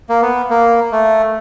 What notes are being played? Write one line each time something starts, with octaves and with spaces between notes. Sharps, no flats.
A#3
B3
A#3
A3